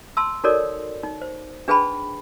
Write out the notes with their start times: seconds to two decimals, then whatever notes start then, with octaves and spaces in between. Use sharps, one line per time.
0.17 A5 C6 E6
0.44 D#4 F#4 A4 A#4 C#5 D5
1.03 D#4
1.22 C5
1.68 D4 G#4 B4 G5 A5 B5